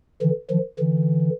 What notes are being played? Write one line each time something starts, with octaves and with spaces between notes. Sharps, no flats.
D3 E3
D#3 F3
D3 E3